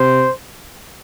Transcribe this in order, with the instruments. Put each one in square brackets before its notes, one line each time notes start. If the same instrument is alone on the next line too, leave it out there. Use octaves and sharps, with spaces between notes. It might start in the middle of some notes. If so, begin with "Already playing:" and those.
Already playing: [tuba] C3 [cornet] C5